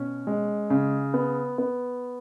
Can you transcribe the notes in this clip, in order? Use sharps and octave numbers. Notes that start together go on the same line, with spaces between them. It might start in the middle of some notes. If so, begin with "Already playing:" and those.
Already playing: B2 C#4
G#3
C#3
B3
B3